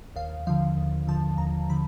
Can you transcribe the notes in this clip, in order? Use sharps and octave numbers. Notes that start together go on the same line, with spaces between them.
D#2 F5
D3 F3 F5
D#2
D3 F3 A5
D#2 A#5
D3 F3 B5